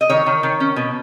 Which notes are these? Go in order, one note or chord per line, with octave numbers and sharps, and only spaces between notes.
D#5
D#3 C#5
D#3
D#3
C#4
B2